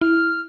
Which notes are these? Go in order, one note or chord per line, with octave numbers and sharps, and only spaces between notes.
E4 F6